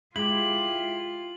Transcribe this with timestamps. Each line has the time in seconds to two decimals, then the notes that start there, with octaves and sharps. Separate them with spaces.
0.16 G#3 E4 F4 G4 F#7